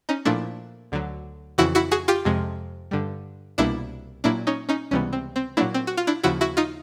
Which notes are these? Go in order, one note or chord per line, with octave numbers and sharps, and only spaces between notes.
C#4 D#4
A#2 F3 A3 D4 E4
D2 D3 F#3
F2 C#3 E3 E4 F#4
E4 F#4
F#4 G#4
F4 G4
F2 C3 F3 G#3
G2 D3 G3
C2 B2 G3 A#3 D4 E4
A#2 F#3 A#3 D4 E4
C#4 D#4
C#4 D#4
C#2 C3 E3 G3 B3 C#4
C4
C4
A#2 F#3 A#3 D4 E4
C4
F#4
F4
D4 E4
D#2 C#3 F3 E4 F#4
E4 F#4
D#4 F4